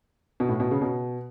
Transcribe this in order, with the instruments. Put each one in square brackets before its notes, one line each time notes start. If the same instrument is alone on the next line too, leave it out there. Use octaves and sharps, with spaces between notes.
[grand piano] B2
A2
B2
C#3
B2